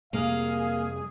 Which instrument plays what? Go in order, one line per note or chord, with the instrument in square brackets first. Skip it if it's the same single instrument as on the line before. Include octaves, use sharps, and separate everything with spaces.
[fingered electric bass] F2 C3 G3 [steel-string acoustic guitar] A#3 [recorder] G#4 [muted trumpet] F5